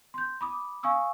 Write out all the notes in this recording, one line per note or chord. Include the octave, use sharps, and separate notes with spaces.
C6 G6
B5 D6 D#6
F5 G#5 C#6 D#6 E6